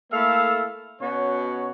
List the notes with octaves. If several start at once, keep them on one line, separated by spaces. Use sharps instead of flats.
A3 A#3 E4 A4 E5 F5
B2 C#4 F#4 C#5